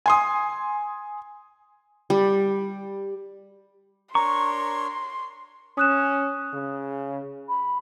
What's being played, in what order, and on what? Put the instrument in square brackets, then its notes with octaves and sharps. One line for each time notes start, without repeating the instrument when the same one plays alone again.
[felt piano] G#5 C6 D#6
[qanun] G3
[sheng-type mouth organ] D4 A#4 C#5 [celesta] A#5 [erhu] C6 [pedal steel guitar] C#6
[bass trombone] C#4 [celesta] D#6 F#6 E7
[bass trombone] C#3
[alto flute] B5